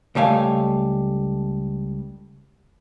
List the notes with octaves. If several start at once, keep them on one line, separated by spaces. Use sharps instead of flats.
C#2 G3 A3 F5 G#5